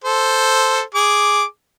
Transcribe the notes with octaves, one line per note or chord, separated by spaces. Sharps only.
A4 C5
G#4 D6